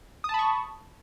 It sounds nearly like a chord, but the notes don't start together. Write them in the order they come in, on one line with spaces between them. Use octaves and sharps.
D#6 A5 B5 C#6